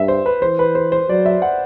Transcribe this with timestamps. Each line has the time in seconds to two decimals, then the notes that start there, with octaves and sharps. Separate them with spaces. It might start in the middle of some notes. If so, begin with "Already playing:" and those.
Already playing: G2 E5
0.08 C5
0.26 B4
0.42 E3 C5
0.59 B4
0.75 C5
0.92 C5
1.09 F#3 D5
1.26 E5
1.42 F#5